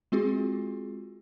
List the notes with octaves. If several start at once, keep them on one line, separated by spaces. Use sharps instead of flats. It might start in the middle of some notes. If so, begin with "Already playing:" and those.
G#3 C4 F4 F#4 G#4